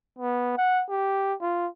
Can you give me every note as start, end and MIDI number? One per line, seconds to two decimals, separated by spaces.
0.19 0.53 59
0.57 0.83 78
0.88 1.34 67
1.41 1.68 65